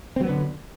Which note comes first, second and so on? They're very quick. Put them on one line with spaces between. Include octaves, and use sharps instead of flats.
C4 F#3 B3 D3